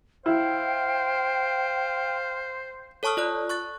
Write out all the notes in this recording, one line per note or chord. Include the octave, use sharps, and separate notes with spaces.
E4 C5 F5 G5
A4 C#5 A5 C#6 D#6 F6
F4 D5 F#6
C#6 F#6 A6